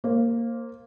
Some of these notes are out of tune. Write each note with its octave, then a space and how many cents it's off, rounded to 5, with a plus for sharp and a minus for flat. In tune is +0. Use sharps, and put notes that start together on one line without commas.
A#3 -5 C5 +25